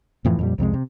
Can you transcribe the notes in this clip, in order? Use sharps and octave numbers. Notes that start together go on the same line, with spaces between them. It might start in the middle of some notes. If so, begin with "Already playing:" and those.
F2 A2 E3 F3
F2 A#2 G3
C2 F2 C3 G#3
C3